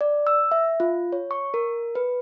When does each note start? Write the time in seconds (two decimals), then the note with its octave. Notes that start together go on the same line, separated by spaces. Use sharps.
0.01 D5
0.27 E6
0.52 E5
0.80 F4
1.13 C#5
1.31 C#6
1.54 A#4
1.95 B4